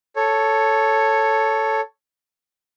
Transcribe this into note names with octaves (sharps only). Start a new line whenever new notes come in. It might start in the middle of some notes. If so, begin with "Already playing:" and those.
A4 C#5